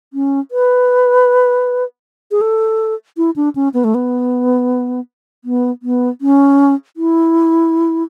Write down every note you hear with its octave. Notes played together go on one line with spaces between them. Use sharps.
C#4
B4
G#4
A4
E4
D4
C#4
B3
A3
B3
B3
B3
C#4
E4